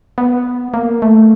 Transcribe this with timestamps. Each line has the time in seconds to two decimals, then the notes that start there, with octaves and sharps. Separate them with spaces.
0.18 B3
0.74 A#3
1.02 A3